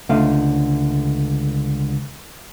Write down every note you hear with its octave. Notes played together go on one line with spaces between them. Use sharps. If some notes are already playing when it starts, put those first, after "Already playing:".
C#2 D3 A3 F5